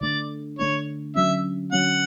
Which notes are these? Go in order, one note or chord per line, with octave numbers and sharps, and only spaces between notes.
D3 A3 D4 D5
D3 A3 D4 C#5
D3 F#3 C#4 E5
D3 F#3 C#4 F#5